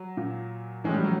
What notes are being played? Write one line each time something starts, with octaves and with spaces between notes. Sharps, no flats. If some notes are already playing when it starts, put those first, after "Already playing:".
Already playing: F#3
A#2
A2 E3 G#3
G3
F#3